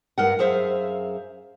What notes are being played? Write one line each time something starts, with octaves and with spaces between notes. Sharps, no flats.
G2 A#4 F#5
F#2 G#4 C5 E5 F5